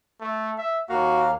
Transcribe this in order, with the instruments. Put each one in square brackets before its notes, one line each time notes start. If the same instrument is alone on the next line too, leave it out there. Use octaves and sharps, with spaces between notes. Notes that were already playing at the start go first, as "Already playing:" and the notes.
[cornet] A3
E5
[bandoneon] D#2 A#3 F5 [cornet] F#4